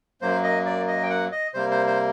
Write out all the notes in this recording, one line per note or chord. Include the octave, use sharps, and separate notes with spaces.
F#2 F#3 A#3 C5
D#5
D5
D#5
G5
F#5
D#5
C3 G3 A#3 C5
C5
C5